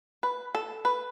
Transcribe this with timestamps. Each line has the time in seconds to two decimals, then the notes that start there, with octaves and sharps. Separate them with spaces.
0.23 B4
0.55 A4
0.85 B4